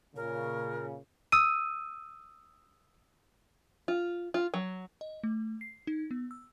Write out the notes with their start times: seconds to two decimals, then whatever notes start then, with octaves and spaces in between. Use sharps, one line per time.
0.16 A#2 C#3 A#4
1.32 D#6 E6 D#7
3.88 F4
4.34 F4
4.54 F#3
5.01 D#5
5.24 A3
5.61 C7
5.87 D#4
6.11 B3
6.31 E6